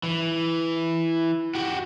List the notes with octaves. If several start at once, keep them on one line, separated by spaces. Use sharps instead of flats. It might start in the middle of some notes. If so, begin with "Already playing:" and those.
E3
F#4 G4